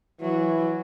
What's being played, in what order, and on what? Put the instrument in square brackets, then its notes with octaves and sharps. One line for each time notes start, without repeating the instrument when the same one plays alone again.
[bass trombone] E3 [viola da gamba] F#3